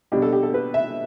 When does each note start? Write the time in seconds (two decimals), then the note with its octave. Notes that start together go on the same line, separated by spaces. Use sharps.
0.12 B2 G3 D4 G4
0.22 A4
0.33 G4
0.43 A4
0.54 B4
0.74 E5